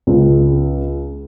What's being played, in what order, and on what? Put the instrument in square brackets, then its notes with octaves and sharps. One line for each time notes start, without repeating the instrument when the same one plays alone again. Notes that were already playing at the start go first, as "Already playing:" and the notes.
[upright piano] C#2